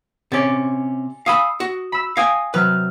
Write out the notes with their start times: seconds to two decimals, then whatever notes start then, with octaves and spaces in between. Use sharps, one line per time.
0.32 C3 C#4 D5 G#5 A6
1.26 F5 G#5 B5 C#6 D#6 E6
1.60 F#4
1.92 B5 E6
2.17 F5 G5 G#5 D#6 G#6 A#6
2.54 C3 F#3 B4 F6